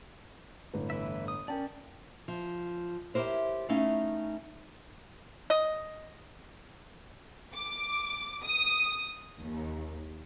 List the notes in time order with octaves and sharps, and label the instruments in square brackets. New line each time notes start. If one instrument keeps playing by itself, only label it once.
[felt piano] G1 A2 B4
[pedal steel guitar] E3 E4 E5
D#6
[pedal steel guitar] C#4 D5 [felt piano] A#4 G5 A5
[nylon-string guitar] F3
E4 G4 A#4 C5 C#5
A3 C#4 D#4 E4 A4 F5
[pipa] D#5
[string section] D6
D#6
D#2